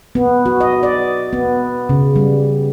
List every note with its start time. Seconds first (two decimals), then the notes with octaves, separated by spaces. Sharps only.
0.15 B3
0.46 F#4
0.61 D#5
0.83 D5
1.33 B3
1.89 C#3
2.16 G3